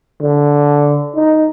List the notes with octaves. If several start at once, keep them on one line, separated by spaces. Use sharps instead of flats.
D3
D#4